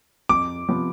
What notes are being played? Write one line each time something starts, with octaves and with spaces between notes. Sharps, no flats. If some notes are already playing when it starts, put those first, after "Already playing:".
F2 D6
C3 F3 B3